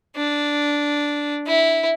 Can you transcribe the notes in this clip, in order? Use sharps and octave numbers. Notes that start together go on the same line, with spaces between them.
D4
E4